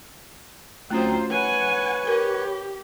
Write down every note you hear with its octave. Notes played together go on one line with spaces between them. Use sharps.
D2 F#3 A3 C4 C#4 F4 F#4 C5
B4 C#5 F#5 G#5
G4 A#4